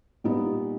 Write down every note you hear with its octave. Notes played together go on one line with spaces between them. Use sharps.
A#2 G3 B3 D#4